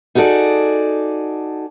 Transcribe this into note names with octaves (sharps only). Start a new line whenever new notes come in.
D#4 F#4 G#4 A4 D5